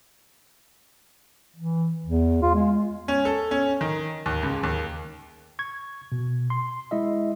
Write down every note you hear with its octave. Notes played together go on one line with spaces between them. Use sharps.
E3
E2
F4
G#3
C#4
A4
C#4
D#3
D#2
C#2
D#2
C#6 G#6
B2
C6
G#3 E4 D#5 E5